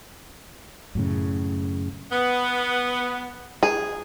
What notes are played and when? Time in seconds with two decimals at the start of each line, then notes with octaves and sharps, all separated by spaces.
0.95 F#2 A2 C#3
2.10 B3
3.63 G#4